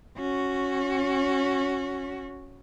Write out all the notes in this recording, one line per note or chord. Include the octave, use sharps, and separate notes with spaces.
C#4 F#4